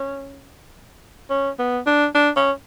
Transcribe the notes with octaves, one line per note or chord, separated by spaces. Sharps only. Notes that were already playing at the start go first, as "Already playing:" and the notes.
Already playing: C#4
C#4
B3
D4
D4
C#4